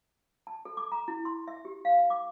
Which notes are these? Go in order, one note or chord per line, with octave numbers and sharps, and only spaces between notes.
A5
A4
D6
A#5
E4
C6
E5
G4
F5
D6